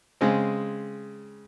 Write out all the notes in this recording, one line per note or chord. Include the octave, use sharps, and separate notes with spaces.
C#3 G#3 C4